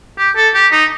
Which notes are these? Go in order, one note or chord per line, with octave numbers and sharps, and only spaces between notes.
G4
A4
G4
D#4